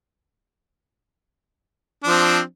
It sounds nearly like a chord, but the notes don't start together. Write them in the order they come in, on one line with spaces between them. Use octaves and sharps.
D4 F3 C4